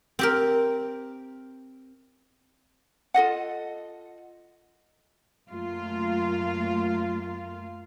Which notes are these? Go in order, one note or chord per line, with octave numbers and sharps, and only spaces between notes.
C4 G4 A#4
F4 A4 D#5 F#5
F#2 A3 A#3 F4 F5